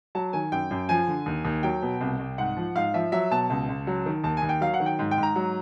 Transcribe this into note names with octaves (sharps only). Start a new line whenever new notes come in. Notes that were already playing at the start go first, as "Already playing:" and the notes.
F#3 A5
D#3 G#5
F#2 G5
F#2
F3 G#5
D3
D#2
D#2
F#3 G5
B2
C2
C2
G#2 F#5
F3
G#2 F5
F3 E5
F#3 E5
B2 A5
C#2
C#2
F#3
D#3
D#2 A5
G#5
D#2
G5
F#3 F5
F#5
D#3
G5
G#2
G5
G#2
A#5
F#3